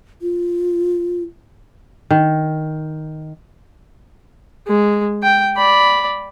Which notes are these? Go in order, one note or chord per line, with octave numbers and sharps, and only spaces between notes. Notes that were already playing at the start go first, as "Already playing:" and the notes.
F4
D#3
G#3
G5
D5 B5